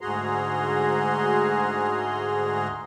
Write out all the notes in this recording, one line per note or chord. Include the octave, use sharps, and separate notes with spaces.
D2 G#2 F#4 G#4 A#5 C6